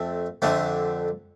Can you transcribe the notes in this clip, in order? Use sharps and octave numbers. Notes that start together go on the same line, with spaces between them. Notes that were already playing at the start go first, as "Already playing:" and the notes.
Already playing: F2 A3 C4
F2 D3 A3 C4